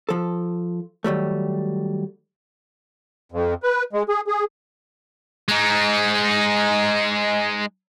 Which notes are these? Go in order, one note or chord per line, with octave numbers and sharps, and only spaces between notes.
F3 A4
D#3 F#3 G3 A3
F2
B4
G#3
G#4
G#4
G#3 D#4